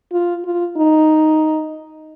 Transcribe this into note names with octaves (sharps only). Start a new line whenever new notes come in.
F4
F4
D#4